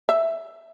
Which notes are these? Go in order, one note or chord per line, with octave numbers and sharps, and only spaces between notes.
E5